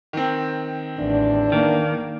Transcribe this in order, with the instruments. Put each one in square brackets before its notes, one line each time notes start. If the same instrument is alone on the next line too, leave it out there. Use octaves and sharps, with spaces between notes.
[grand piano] D#3 C4
[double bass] A1 [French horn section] E2 D4
[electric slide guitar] D#3 [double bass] A#3